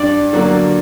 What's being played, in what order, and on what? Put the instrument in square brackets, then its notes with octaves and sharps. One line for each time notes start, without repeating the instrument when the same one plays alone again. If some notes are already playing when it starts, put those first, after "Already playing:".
Already playing: [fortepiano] G2 D4 D5
D3 F#3 A#3